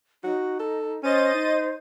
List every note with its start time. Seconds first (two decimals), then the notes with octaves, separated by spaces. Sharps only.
0.24 D#4 F#4
0.59 A4
1.03 C#4 C5 D#5 A6 D#7
1.34 D#4